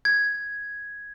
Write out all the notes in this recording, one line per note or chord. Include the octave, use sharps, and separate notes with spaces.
G#6